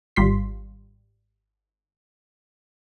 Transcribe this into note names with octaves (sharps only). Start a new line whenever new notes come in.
G#1 G3 F4 C6 B6